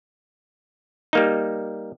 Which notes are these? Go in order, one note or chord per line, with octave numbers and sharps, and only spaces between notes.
G3 A#3 D#4